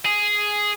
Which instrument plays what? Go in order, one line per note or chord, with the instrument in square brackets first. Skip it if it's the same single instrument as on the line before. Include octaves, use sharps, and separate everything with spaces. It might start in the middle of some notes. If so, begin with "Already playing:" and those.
[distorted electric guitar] G#4